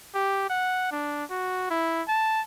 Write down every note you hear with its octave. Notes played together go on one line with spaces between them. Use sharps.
G4
F#5
D4
F#4
E4
A5